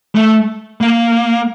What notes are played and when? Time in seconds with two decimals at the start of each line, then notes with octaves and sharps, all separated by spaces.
0.15 A3
0.81 A#3